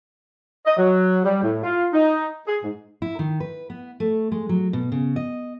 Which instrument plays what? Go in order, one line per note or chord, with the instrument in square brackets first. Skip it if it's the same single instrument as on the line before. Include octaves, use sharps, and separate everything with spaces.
[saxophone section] D#5
F#3
G3
A2
F4
D#4
G#4
G#2
[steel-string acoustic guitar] E4
D#3
B4
B3
A3
G#3
F#3
B2
C#3
D#5